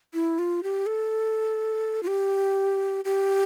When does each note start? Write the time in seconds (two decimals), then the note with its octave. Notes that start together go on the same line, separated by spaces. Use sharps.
0.14 E4
0.39 F4
0.63 G4
0.86 A4
2.03 F4
2.07 G4
3.05 G4